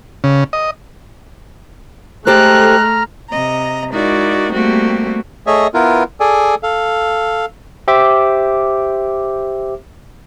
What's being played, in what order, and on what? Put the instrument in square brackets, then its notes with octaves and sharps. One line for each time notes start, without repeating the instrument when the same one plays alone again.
[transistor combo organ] C#3
D#5
[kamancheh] G#3 F#6 [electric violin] A3 [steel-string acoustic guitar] G4 A4 C5 [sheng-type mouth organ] A#5 F6
[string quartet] C3 D#5 A#5
G#3 D#4 E4 F#4 A#4 D5
G3 A3 A#3 C4 F#4 G4
[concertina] A3 G#4 C#5 D#5 E5
B3 E4 F4 A#4 B4
G#4 A4 D5 G#5
A4 F5
[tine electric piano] G4 C5 E5 D6